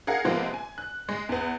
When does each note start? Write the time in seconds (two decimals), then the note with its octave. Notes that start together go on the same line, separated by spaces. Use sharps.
0.07 G#4 A#4 F5 F#5
0.24 C3 F3 G#3 A#3 B3
0.54 G#5
0.78 F#6
1.09 G#3
1.29 E2 B3